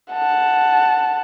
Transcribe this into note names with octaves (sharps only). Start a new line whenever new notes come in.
F#5 A5